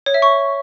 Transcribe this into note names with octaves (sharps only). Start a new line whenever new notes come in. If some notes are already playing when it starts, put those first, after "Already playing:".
C#5
E5
C#6